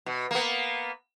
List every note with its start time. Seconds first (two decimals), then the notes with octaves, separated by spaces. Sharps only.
0.06 B2
0.31 A#3 B3